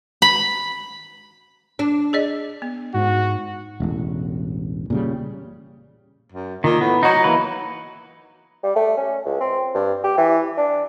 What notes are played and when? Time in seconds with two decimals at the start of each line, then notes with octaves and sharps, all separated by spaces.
0.22 B5
1.79 D4
2.13 G#4 D5 D#5
2.62 B3
2.94 G#2 F#4
3.80 E1 A1
4.90 A#2 C#3 G3
6.32 F#2
6.64 A#2 D#3
6.81 A2 B3
7.03 F#3 D#4 F#4
7.24 E3 A#3 B4
8.63 G3
8.76 A3
8.97 C#4
9.25 C#2
9.40 C4
9.75 G2
10.04 G4
10.18 E3
10.57 D4